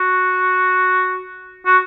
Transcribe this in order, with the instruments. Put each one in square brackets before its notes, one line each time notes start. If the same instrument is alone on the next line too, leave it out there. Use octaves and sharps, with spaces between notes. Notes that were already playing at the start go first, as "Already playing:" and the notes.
Already playing: [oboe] F#4
F#4